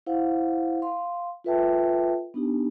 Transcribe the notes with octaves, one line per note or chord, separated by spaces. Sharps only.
E4 C5 F5 F#5
F5 C6
F4 A4 B4 E5 G5 A5
B3 D4 D#4 G4